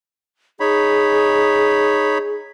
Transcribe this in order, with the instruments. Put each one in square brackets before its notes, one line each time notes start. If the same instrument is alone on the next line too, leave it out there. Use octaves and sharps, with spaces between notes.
[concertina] D#4 C#5 B5 [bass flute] G#4